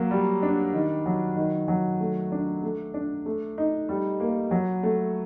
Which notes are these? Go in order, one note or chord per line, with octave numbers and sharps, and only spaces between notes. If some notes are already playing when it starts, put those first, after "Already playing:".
Already playing: F#3 A#3
G3
D4
D#3
F#3
D#3
F#3
A3
D4
A3
D4
A3
D#4
G3
A#3
F#3
A3